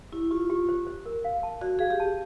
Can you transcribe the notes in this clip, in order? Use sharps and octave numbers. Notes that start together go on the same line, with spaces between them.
E4 G4
F4 G4
G4
C5
C5
A#4
F5
A5
F#4 D5
G#4 F5
G4
A5